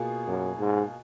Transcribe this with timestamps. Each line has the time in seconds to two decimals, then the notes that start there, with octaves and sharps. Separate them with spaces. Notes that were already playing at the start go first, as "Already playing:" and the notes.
Already playing: B2 A#3 F4 G#4
0.27 F#2
0.60 G#2